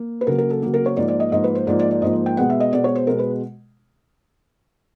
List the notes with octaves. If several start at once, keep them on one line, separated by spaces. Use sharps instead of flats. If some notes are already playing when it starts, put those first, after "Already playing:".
Already playing: A#3
B4
C#3 F#3 A#3 A#4
A#4
A4
C#3 F#3 A#3
A#4
C#5
G#2 F3 A#3 D5
D5
D#5
G#2 F3 A#3 D#5
B4
C5
G#2 F3 A#3 D5
D5
D5
G#2 F3 A#3 D#5
G5
B2 G#3 B3 F#5
E5
D#5
B2 G#3 B3 D5
C#5
C5
B2 G#3 B3 A#4
B4